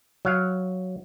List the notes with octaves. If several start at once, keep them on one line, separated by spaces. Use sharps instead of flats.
F#3 F5